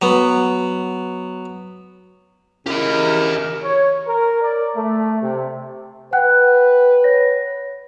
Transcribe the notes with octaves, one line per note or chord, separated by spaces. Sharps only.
F#3 B3
C#3 E4 G4 A#4 D#5
C#5
A#4
D5
A3
C3
B4 F#5 G5 F#6
C#5 A#6